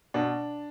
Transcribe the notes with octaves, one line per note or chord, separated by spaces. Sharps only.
B2 D4